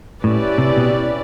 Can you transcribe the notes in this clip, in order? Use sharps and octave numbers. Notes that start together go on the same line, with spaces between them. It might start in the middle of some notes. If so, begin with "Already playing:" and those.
A2 C#4 E4 G4 B4 D5
C3
B2